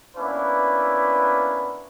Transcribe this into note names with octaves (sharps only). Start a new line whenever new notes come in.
A#3 B3 C#4 D4 E4 B4